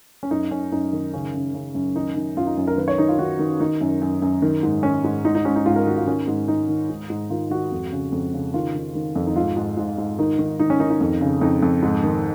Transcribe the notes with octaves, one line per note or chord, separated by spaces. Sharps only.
C#4
F#2 D#4
F#2 C#4
F#2 D#4
D#3
C#3 C#4
C#3
C#3
F#2
D#3 D#4
D#3
F#2 F4
D#4
F#2
A#4
D#3 B4
C#5
D#3 D#4
F4
D#3 F#4
D#3
D#3 D#4
F#2
F#2
F#2
D#3
G#2
D#3 C#4
G#2
G#2 D#4
D#4
G#2 C#4
D#4
G#2 F4
A#4
D#3 F#4
F4
D#3 C#4
G#2
D#3 D#4
D#3
G#2
G#2
D#3 F4
D#3 F#4
F2
C#3
F2
C#3
D#3 F4
D#3
D#3
F2
D#4
G#2 F4
G#2
G#2
G#2
D#3 D#4
D#3
D#3 D#4
C#4
D#3 D#4
D#4
F2
C#3
F2 D#4
F2
G#2
D#3